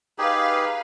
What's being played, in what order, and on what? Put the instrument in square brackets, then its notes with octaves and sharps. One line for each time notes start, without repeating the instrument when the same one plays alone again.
[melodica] D#4 G4 G#4 [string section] B4 F5